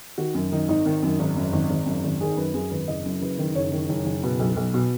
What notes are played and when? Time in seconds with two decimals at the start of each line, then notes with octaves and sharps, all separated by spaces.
0.18 D#3 F#4
0.34 F#2
0.52 D#3 D#4
0.68 G#1 D#4
0.86 D#3
1.03 F#2
1.19 G#1
1.36 F#2
1.53 G#1
1.70 G#1
1.86 F#2
2.04 G#1
2.21 D#3 G#4
2.37 F#2 B4
2.54 F#2 G#4
2.71 G#1 B4
2.88 F#1 D#5
3.05 F#2
3.21 F#1 B4
3.38 D#3
3.55 F#1 C#5
3.72 D#3
3.89 F#1
4.06 F#1
4.23 B2 B4
4.39 B1
4.56 B1
4.74 B2